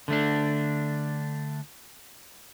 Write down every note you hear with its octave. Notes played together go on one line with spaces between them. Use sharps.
D3 A3 D4